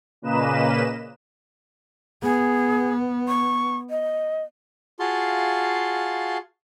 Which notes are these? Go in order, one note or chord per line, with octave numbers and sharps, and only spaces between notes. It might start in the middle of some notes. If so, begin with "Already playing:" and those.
A#2 C#3 A#3 B4 D#5 E7
B3 G#4
C#6
D#5
F4 F#4 G#4 F5 A5 C6